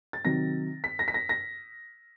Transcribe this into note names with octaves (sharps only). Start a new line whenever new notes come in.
A6
C3 D#3 F#3 A#6
B6
A#6
B6
A#6
A#6